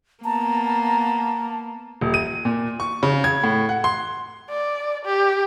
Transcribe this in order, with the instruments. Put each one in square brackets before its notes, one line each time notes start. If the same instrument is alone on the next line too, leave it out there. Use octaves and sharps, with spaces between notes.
[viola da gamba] A#3 B3 [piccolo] A5 [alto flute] A#5
[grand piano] D#1
D#7
A#2
C#6
C#3
G#6
A2
F#5
C6
[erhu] D5
G4